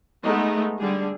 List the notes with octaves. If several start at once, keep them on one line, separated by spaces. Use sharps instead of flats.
G#3 A3 B3 D#4
D3 G3 G#4